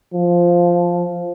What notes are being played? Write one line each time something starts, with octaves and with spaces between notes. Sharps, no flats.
F3